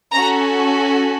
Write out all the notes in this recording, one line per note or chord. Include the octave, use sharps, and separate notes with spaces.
C#4 F#4 A4 A#5